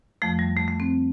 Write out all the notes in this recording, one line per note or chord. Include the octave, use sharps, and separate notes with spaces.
F2 F3 A3
G3
A3
A3
C4